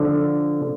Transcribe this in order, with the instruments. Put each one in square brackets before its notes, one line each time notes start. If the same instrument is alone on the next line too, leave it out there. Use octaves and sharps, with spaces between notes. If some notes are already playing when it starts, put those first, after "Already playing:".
Already playing: [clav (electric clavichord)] D3 F3